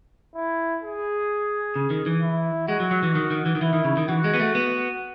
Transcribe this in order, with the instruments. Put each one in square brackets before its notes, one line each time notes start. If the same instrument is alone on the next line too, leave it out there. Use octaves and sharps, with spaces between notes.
[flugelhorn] E4
G#4
[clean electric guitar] C#3
D#3
E3
[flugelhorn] E4
[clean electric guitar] G#3 [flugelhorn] F#4
[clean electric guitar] F#3
F#3
E3
D#3
D#3
E3
D#3
[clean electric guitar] E3 [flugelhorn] E4
[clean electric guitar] D#3
C#3
D#3
[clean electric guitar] E3 [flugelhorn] F#4
[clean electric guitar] G#3
B3
A3
B3